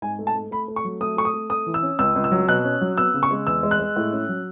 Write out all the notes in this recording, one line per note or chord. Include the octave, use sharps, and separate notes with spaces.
G#2 G#5
A3
A5
A3
A3 B5
A3
C#6
F#3
A3 D#6
A3 C#6
D#6
A3
A3 D#6
E3
E6
C#4
C#2 E6
C#2
E6
F#3
B2 F#6
C#4
F#3
B3 E6
C#3
C#6
G#3
E2 E6
G#3
F#6
G#3
A2
C#4
F#3